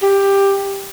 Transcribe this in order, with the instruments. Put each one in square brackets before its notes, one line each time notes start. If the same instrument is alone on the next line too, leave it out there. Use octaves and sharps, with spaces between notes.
[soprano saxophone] G4